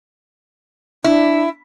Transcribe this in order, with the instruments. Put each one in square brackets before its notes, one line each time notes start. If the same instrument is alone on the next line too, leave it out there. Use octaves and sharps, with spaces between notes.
[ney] D4 [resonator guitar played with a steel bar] E4